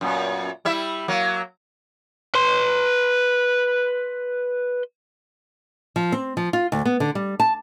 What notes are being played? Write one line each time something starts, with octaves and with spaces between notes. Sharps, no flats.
F#2 A#2 B3
G3 E4 E5
F#3 A#3
B4 C6
F3
C4
F3
F4
D2
B3
D3
G3
A5